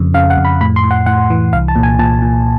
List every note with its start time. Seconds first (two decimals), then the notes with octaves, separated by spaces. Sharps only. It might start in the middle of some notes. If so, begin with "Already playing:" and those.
Already playing: F2 C#3
0.14 C#3 F5
0.30 F#5
0.37 F2
0.45 B5
0.61 A2 B5
0.76 C6
0.84 A2
0.91 F#5
1.06 A2 F#5
1.30 E3
1.53 C2 F5
1.68 A5
1.76 A#2
1.83 G#5
1.99 A#2 A5
2.22 A#2